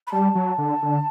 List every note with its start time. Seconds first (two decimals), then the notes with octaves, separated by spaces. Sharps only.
0.07 B5
0.12 G3 A5
0.35 F#3
0.58 D3
0.83 D3